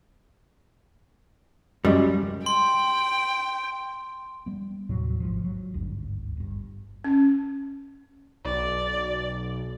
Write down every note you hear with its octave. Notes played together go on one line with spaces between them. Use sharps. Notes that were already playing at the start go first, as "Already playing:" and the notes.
F#2 G3 G#3
G5 C6
G3 B3
D#2 A2 C3 F#3
G#1 G#2 F3
F#3
G#1 D2 G2
G1 G2
C#4
B1 D5